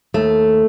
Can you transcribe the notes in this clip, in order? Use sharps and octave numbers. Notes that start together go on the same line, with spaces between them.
D#2 A3